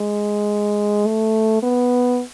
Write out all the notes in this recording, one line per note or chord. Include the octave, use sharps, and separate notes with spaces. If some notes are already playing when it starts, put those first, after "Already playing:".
Already playing: G#3
A3
B3